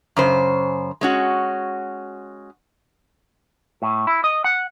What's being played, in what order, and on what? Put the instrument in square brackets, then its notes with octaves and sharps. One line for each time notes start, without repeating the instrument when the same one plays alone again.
[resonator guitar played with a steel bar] F#2 C#3 C5
G#3 C#4 F#4
[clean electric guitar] A2
E4
D#5
F#5